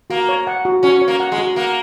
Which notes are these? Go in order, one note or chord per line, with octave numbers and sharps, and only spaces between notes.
A#3 F#4
C#5
F#5
F#4
C#4 F#4
C#5
A#3
F#5
G#3
F#4
A#3 F#5